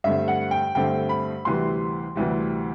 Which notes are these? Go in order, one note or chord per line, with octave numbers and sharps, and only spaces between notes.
G2 D3 A3 C4 E5
F#5
G5
G2 D3 A3 C4 G5
B5
D2 C3 E3 G3 C6
D2 C3 E3 G3